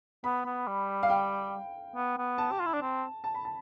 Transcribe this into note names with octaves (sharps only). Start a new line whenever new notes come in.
B3 B5
B3
G3
F5
G5
B3
B3
A5
G4
F4
E4
D4
C4
A5
B5
A5